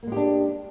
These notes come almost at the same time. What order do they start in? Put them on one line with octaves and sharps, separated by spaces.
A#3 G#3 G4 D4